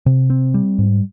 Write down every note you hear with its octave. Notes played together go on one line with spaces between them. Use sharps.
C3
C4
G3
G#2